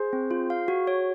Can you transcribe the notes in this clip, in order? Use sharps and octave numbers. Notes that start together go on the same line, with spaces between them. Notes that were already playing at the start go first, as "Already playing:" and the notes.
Already playing: G#4 C5
C4
F4
F5
F#4
C#5